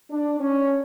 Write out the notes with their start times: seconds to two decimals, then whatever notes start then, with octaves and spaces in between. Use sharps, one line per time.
0.10 D4
0.40 C#4